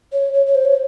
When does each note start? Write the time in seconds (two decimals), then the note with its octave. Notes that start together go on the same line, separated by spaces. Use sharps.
0.13 C#5
0.33 C#5
0.46 C#5
0.55 C5
0.65 C#5